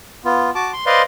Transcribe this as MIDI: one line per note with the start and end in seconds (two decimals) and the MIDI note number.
0.25 0.50 59
0.25 0.50 65
0.55 0.72 66
0.55 0.72 81
0.55 0.72 86
0.73 0.85 84
0.86 1.02 71
0.86 1.02 72
0.86 1.02 74
0.86 1.02 75
0.86 1.02 77
0.86 1.02 84